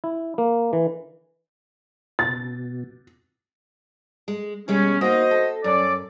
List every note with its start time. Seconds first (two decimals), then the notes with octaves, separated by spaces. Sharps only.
0.04 E4
0.38 A#3
0.73 E3
2.19 B2 A6
4.28 G#3
4.68 B2 G3 G#3 C#4
5.01 A#3 D#4 F#4 C5 D#5
5.31 A4
5.64 F#2 C#4 A4 D5